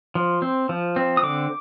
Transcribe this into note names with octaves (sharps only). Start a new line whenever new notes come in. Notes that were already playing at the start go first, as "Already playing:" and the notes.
F3
C4
F3
C4
D#6
D3 D6